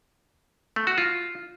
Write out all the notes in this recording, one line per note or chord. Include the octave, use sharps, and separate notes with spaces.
A3
F#4
F4